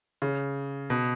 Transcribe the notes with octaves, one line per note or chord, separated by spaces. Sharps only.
C#3
B2